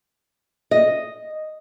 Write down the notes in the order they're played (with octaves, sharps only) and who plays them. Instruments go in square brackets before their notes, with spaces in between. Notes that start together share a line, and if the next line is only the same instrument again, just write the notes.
[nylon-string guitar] D#5